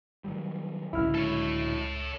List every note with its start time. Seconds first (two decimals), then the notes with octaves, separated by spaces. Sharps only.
0.24 D#3 F#3 G3
0.93 C#2 A2 D3 G#3 E4 F6
1.15 A4 C#5